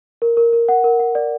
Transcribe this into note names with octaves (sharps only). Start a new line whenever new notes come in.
A#4
A#4
A#4
F#5
A#4
F#5
D5